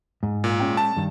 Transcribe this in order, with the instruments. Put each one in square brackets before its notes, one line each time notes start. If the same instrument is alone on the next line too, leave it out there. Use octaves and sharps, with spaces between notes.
[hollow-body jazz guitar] G#2
[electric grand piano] A#2
[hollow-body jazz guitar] G#3 C#4 G5
[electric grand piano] A5
[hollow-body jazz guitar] G2 D#3